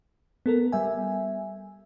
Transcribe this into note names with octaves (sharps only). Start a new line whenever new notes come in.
B3 A4 A#4
G3 E5 G#5